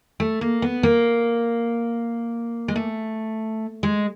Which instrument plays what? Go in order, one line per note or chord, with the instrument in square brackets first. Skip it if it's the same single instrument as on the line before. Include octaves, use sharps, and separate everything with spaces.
[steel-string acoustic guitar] A3
A#3
B3
A#3
G#3
A3
G#3